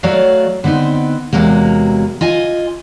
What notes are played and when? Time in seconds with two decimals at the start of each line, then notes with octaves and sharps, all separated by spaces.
0.03 F#3 A3 F#4 C#5 D5 F5
0.64 D3 B3 C4 D#4
1.33 E2 C3 F#3 G#3 A#3
2.21 F4 D#5 G#5